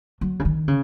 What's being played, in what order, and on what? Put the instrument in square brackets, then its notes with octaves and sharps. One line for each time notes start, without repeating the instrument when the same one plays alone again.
[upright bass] F#3
C#3
D#3
C#3